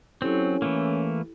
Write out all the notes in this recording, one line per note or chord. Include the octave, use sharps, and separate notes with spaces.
F#3 C4 C#4 E4 G4 A4
E3 A3 A#3